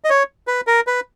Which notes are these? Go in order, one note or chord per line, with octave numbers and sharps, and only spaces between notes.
D#5
C#5
B4
A#4
B4